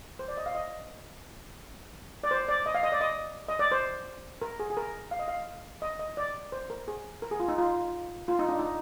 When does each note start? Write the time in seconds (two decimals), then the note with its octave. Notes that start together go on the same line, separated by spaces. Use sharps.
0.19 C5
0.28 D5
0.37 D#5
0.46 F5
0.55 D#5
2.24 D5
2.31 C5
2.49 D5
2.66 D#5
2.75 F5
2.83 D#5
2.92 D5
3.01 D#5
3.48 D#5
3.59 D5
3.72 C5
4.42 A#4
4.60 G#4
4.70 G#4
4.77 A#4
5.11 F5
5.19 D#5
5.28 F5
5.82 D#5
5.99 D#5
6.17 D5
6.52 C5
6.70 A#4
6.88 G#4
7.22 A#4
7.31 G#4
7.40 F4
7.48 D#4
7.58 F4
8.28 F4
8.39 D#4
8.49 D4
8.59 D#4